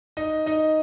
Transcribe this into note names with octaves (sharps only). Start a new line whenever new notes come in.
D#4 D#5
D#4 D#5